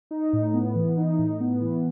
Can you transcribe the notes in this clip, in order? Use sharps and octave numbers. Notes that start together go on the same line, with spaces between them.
D#4
A2
B3
E3
D#4
A2
B3
E3